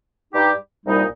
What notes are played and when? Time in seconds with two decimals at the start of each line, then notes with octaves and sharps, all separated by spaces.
0.34 G2 G3 D#4 G4
0.85 C2 A#2 G3 D#4